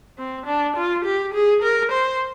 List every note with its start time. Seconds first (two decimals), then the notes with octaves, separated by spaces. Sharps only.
0.18 C4
0.46 D4
0.76 F4
1.05 G4
1.34 G#4
1.62 A#4
1.92 C5